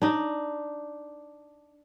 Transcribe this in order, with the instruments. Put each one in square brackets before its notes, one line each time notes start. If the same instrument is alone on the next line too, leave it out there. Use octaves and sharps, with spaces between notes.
[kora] D4 D#4